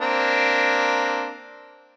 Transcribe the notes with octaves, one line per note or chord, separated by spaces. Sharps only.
A#3 C4 D4